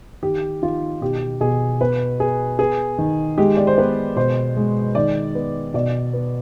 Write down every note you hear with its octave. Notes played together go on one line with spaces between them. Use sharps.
D#3 G4
D#3 F4
B2 G4
B2 G#4
B3 B4
B3 G#4
B3 G#4
D#3
G#3 G4
D5
C5
B3 B4
B2 C5
G#3
D#3 D5
B3
B2 D5
B3